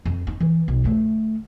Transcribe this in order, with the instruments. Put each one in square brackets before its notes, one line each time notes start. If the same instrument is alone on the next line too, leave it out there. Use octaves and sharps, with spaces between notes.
[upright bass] F2
D#4
E3
B1
D3 A3